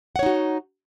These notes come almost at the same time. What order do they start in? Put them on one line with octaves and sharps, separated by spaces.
F#5 C#5 D#4 F#4